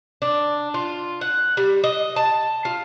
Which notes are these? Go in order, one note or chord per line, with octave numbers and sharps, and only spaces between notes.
D4
F4
F#5
G3
D#5
A5
F4